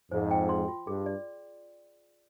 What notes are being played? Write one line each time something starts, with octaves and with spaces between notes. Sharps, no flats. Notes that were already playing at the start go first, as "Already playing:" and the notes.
F2 G#2 C5
G5
C6
F4
G2 G#4
D5